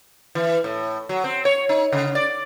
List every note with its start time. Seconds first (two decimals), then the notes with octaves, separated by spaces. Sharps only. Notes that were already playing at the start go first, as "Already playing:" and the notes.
0.35 E3
0.64 A2
1.09 F#3
1.24 C4
1.45 C#5
1.69 D#4
1.92 C#3
2.15 D5